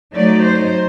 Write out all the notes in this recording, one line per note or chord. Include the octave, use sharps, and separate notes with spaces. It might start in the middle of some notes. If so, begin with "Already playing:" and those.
F#3 A3 D#4 D5
C5